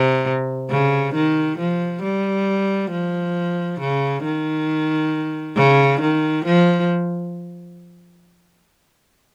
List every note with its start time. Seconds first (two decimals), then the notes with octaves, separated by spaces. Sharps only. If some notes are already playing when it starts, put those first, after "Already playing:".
Already playing: C3
0.70 C#3
1.14 D#3
1.58 F3
2.03 G3
2.91 F3
3.80 C#3
4.24 D#3
5.56 C#3
6.01 D#3
6.45 F3